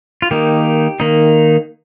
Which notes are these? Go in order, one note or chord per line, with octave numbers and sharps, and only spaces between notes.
F4
D#3 A#3 D#4 G4
D#3 A#3 D#4